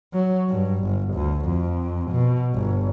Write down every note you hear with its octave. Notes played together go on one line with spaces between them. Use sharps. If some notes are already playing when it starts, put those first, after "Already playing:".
F#3
G2
G1
D2
F2
B2
G1